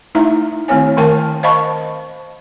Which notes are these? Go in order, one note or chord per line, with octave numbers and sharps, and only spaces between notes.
A3 D#4 E4 E5 A#5
D#3 A3 C4 E4 C#5 G#5
D#3 A3 A#4 G5 A5
C5 D#5 F5 A5 B5 C#6